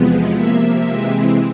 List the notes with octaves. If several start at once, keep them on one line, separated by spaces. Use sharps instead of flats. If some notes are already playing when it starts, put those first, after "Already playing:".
Already playing: E2 C3 F3 G#3 B3
C3 F3 A#3 E5
C3 E3 G#3 C4